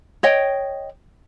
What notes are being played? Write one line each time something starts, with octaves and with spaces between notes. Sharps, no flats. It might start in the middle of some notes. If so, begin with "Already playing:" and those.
C#5 D#5 G5